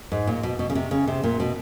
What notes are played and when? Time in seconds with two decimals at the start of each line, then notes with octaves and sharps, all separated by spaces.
0.12 G#2
0.27 A#2
0.43 B2
0.59 B2
0.70 C#3
0.75 C3
0.91 C#3
1.07 C3
1.23 A#2
1.40 B2